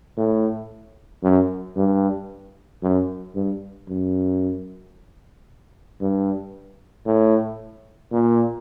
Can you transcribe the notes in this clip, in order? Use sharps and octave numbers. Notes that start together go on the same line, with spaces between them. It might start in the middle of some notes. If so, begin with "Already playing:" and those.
A2
F#2
G2
F#2
G2
F#2
G2
A2
A#2